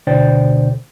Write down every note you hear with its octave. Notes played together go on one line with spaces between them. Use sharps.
D2 B2 D3 C5 D5 G5